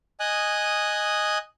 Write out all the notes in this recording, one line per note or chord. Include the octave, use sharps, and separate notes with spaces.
D#5 G#5 D#6 F#6